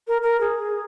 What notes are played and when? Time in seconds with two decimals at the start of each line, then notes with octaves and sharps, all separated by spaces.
0.08 A#4
0.22 A#4
0.40 G#4